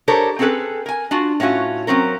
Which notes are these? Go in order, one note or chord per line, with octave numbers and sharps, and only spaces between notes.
D4 G4 A4 A#4 C5 C#5
C4 C#4 G#4 A4 B4
A#4 G#5
D4 F4 F#4
A2 C#4 F4 F#4
F#3 C4 C#4 A#4